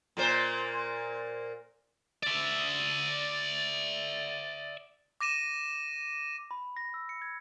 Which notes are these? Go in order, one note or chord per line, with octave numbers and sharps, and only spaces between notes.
A#2 A#3 C5
D5 E5
D6 A#6 D#7 E7
B5
A#6
E6
C#7
G#6